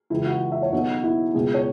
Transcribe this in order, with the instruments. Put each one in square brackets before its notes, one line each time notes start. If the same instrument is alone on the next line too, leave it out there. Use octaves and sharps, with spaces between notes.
[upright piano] C#2 C#3 E3 E4
F#4
E5
C#5
B1 B2 F#4
E4
C#2 B2 G#4
C#5